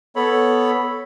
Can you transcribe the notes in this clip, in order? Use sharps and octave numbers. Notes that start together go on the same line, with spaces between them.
B3 A4 C#5 B5